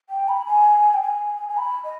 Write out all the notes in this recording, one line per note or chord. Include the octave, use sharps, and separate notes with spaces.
G5
B5
G#5
G5
G#5
G#5
B5
D#5